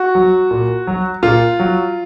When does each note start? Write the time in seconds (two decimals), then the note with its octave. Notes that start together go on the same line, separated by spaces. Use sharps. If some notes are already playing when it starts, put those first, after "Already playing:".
Already playing: F#4
0.15 F#3
0.51 A#2
0.87 F#3
1.23 A#2 F4
1.59 F#3